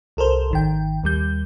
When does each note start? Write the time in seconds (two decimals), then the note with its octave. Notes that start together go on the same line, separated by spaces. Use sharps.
0.17 C2 A4 A#4 C5
0.51 G#1 D#3 G5
1.04 D#2 G3 G6